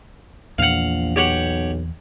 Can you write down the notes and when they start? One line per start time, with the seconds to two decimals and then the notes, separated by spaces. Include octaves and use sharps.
0.58 A#1 E2 A#2 E3 F5 F#5
1.16 B1 G4 C#5 F#5